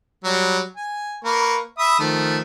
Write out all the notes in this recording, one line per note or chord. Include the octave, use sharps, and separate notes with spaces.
F#3 G3
G#5
A#3 B4 C#6
E5 B5 D#6
D#3 F3 A3